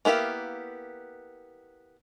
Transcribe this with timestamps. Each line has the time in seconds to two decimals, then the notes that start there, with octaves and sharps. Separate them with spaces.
0.05 A#3 B3 E4 G4 F5